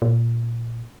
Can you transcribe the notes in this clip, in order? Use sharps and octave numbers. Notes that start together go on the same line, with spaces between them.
A#2